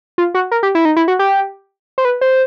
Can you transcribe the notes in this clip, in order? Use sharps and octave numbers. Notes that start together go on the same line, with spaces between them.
F4
F#4
A#4
G4
E4
D#4
E4
F#4
G4
C5
B4
C5